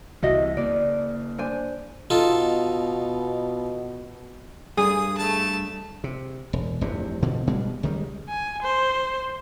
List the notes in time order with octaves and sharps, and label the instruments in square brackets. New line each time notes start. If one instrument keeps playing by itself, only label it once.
[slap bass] C2 C3 E3 [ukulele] F#4 D#5 E5
[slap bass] C#3 A#3 [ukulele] D5
[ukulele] D4 C5 G#5
[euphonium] B2 [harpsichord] D#4 F4 A4
[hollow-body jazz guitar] G2 [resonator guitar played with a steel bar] G#4 [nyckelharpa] D#6
[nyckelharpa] A3 A5
[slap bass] C3
E1
F1 E2 G2 C3
B2 D3 F3
B2 G3 G#3
C#2 D#3 G3 G#3
[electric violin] G#5
C5